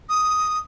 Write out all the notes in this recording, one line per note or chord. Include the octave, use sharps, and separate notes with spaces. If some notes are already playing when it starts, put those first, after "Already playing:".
D#6